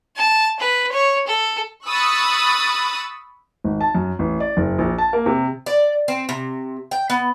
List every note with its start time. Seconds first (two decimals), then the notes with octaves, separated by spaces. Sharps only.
0.16 A5
0.59 B4
0.92 C#5
1.27 A4
1.86 B5 C#6 D#6 E6 F#6 A6
3.64 G#1
3.81 A5
3.95 F#2
4.19 A1
4.40 D5
4.57 F#1
4.78 A#1
4.98 A5
5.13 A#3
5.26 C3
5.66 D5
6.08 C4
6.29 C3
6.91 G5
7.10 B3